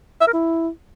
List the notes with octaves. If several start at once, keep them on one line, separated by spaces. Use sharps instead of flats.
E5
A#4
E4